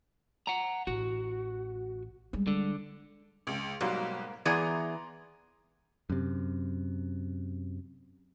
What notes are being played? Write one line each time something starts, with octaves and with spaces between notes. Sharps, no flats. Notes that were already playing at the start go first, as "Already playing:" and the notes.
F#5 A#5
A1 F#4
G3 G#3
D3
C#2
B1 G#2 F#3 G3 A#3
E3 B3 G#4 D5 A#5 C6
F#2 C3